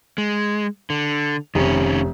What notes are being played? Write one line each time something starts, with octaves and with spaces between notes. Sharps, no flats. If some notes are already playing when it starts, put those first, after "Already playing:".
G#3
D3
F1 D#3 C#4